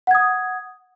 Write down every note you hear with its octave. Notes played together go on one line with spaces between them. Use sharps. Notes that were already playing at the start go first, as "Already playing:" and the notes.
F#5 D#6 G#6